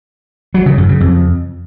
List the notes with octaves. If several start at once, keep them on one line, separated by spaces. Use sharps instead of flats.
F#3
C#3
F#2
C#3
F2